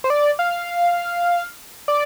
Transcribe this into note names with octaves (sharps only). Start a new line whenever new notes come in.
C5
D5
F5
D5